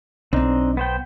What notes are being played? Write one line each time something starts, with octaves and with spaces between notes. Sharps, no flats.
B1 C4 D4 D#4
B3 C5 G5